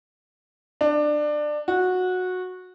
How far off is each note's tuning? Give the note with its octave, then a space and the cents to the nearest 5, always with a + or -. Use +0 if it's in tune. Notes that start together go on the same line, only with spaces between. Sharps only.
D4 +20
F#4 -15